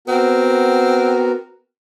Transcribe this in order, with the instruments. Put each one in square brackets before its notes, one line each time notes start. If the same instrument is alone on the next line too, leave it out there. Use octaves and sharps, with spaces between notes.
[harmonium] B3 F#4 A#4 [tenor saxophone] C4